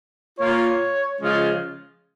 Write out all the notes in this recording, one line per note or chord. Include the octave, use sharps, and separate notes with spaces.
A#2 A#3 F4 C#5
C#3 F3 G#3 C#4 F4